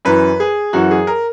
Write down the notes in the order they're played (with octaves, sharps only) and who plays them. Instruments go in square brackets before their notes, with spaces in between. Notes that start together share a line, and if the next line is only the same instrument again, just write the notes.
[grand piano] F#2 E3 B4
G#4
F#2 E3 F#4
G#4
A#4